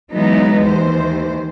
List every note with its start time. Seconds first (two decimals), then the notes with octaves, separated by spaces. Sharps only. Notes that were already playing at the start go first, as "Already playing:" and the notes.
0.14 E3 F#3 G#3 B3 D#4
0.62 D#2 E3 C5